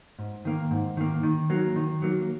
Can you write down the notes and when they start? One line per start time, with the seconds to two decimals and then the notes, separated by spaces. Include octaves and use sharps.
0.19 G#2
0.45 D#3 A#3
0.71 G#2
0.97 D#3 A#3
1.23 D#3
1.50 F#3 A#3
1.76 D#3
2.02 F#3 A#3